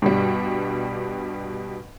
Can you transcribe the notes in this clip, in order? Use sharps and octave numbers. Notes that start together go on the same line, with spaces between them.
G2 B2 G3